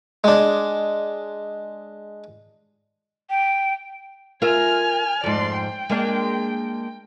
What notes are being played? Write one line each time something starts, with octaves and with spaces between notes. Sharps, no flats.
G#3 D4
G5
F4 A#4 E5 G#5 F6
F2 G#2 D5 C6
G5
G#3 A#3 D4